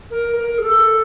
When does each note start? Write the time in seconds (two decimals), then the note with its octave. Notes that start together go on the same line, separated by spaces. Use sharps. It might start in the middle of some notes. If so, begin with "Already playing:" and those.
0.10 A#4
0.36 A#4
0.58 G#4
0.62 A4